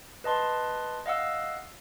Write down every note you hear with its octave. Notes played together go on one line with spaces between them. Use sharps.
B4 D#5 A5 C6
D#5 F5 F#5 E6